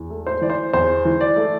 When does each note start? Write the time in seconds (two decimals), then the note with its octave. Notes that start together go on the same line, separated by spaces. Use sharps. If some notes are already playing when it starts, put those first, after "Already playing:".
Already playing: E2
0.10 A3
0.27 C5
0.41 E3 D5
0.50 C5
0.73 E2 C5
1.05 E3
1.21 D5
1.36 A3